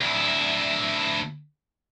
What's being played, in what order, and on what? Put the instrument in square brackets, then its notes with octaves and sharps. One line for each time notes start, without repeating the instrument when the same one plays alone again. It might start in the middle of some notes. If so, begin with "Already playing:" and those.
[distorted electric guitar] D2 E4